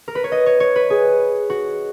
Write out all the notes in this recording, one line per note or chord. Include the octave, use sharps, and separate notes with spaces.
A#4
B4
C#5
D#5
C#5
C#5
B4
G#4
F#4